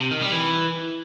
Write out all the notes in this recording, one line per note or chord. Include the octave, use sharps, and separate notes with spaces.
C3
D#3
G3
E3